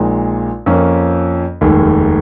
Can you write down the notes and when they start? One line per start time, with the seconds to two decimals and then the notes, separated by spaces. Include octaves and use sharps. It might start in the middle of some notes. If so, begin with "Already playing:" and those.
Already playing: A#1 A#2 G#3 D#4
0.66 F2 F3 A#3 C#4
1.61 F1 D#2 D#3 G#3